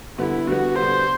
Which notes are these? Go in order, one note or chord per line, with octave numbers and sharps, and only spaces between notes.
D3 G3 B3 E4
D3 G3 B3 F#4
D3 G3 B3 C5